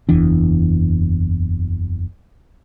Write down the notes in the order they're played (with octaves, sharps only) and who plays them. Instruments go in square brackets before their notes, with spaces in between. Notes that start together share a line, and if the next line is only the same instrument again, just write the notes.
[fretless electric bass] F#1 E2 E3 D4